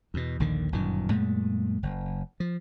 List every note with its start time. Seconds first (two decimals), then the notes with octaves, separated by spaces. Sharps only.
0.14 E2 B2
0.40 A#1 D#2 D3 D#3
0.72 G1 F#2 A#2 D#3
1.10 F#2 A#2 G#3 A3
1.83 F#1
2.40 F3